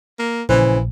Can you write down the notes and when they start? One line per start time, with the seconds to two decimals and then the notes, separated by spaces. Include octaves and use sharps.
0.19 A#3
0.49 A#1 C#3 E3 C5